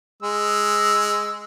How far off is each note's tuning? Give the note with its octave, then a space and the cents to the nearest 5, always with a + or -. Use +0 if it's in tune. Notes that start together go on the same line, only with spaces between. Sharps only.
G#3 +0 E6 +0